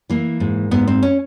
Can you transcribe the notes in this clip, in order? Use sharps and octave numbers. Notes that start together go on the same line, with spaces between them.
E3 A#3
G#2
G#2 B3
C4
C#4